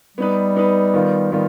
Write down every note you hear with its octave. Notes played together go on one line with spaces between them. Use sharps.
G3 B3 D#4 B4
B3 D#4 B4
D#3 B3 F4
D#3 G3 B3 F4